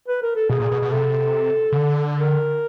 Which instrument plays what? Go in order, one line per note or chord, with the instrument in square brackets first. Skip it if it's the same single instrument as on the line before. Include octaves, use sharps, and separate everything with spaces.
[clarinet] B4
A#4
A4
[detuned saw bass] B2 [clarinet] G#4
[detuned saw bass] A#2
B2
B2
[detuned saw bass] C3 [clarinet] A4
[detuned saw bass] C#3
D3
[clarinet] A#4